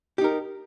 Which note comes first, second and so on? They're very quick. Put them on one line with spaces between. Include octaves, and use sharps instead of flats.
G4 D#4 A#4